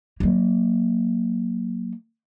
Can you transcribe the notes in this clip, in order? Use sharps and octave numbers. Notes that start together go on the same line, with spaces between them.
F#3 A#3